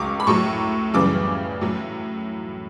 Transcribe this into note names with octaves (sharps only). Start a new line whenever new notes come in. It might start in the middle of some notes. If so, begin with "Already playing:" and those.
Already playing: C#2 C#3 F#3 C#6 D6
B5
A2 F#3 C#6
F#2 C#3 E3 G3 D6
A2 F#3